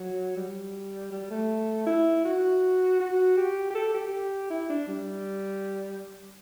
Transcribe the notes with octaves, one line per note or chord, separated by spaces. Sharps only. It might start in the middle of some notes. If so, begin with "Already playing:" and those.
Already playing: F#3
G3
G3
A3
E4
F#4
F#4
G4
G4
A4
G4
E4
D4
G3